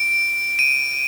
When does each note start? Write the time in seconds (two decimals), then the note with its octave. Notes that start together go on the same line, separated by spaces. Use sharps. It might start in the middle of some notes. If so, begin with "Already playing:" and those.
Already playing: D7
0.59 D#7